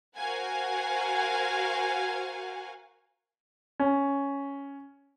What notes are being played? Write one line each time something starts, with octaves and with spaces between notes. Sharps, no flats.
F#4 A#4 C5 F5 F#5 G#5
C#4